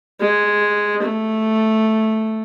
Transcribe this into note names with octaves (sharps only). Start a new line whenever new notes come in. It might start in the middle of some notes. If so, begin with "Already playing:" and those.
G#3
A3